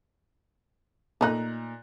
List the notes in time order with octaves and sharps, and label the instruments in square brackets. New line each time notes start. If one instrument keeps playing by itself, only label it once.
[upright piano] A#2 A#5 F#6 [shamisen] A3 D#4